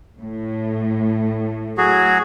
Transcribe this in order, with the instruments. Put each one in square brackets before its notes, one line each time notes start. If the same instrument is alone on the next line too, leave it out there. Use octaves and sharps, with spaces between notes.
[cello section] A2
[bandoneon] F#3 F#4 G#4